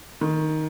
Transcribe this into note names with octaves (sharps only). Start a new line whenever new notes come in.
D#3